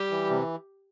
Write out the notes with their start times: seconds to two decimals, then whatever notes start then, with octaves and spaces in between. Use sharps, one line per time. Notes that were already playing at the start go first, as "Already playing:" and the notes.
Already playing: G3 G4
0.11 E3
0.30 C3